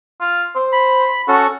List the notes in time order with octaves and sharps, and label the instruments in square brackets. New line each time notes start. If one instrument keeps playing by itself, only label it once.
[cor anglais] F4
C5
[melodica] B5
[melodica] C#4 A4 [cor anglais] F#4